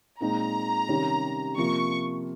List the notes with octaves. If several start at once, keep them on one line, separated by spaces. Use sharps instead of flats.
A#2 G#3 C4 D#4 A#5
C3 D#3 G3 C#4
C3 F3 A#3 F4 C#6